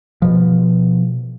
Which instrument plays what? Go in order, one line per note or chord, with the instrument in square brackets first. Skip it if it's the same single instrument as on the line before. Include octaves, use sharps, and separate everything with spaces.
[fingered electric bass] B2 F3